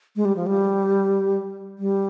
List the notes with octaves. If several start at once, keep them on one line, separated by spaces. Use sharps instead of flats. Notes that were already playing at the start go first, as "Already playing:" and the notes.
G#3
G3
F3
G3
G3